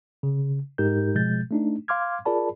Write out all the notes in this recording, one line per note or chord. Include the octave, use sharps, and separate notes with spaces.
C#3
G#2 G#3 D#4 G4 A#4 G6
B2 F3 G#3 G6 A6
A3 D4 D#4
F5 C6 D6 F6 G#6
F4 G#4 A#4 D5 A5 B5